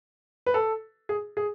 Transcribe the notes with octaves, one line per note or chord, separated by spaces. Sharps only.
B4
A4
G#4
G#4